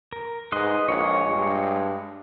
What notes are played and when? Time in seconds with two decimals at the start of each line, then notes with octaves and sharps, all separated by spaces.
0.13 A#4
0.52 G#2 B4 D#5 C6
0.88 A#1 G#3 C#5
1.29 G2